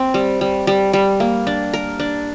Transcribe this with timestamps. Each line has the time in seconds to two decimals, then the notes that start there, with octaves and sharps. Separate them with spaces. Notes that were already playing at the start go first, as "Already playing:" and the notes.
Already playing: C4
0.14 G3
0.41 G3
0.67 G3
0.93 G3
1.20 A#3
1.47 D4
1.73 A#4
2.00 D4